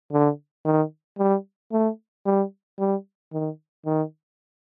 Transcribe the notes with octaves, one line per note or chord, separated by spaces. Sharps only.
D3
D#3
G3
A3
G3
G3
D#3
D#3